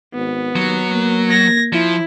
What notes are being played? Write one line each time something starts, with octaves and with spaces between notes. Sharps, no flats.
G#1 B3
D#2 F#3
A#3
G#6 A#6
F3 E4